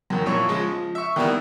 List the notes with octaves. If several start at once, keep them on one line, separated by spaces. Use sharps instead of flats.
F#2 D#3
A#1 A#2 E4 C#5 C#6
C#3 F3 G#3
F3
E5 C#6
D#3 G3 A#3 B3 E4